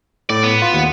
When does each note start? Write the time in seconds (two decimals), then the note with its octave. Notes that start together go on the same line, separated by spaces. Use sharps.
0.30 A2 D5
0.43 B3
0.62 F4
0.74 D#2 F#5